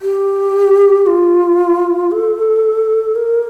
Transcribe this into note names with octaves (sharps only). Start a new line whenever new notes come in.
G4
F4
A4
A#4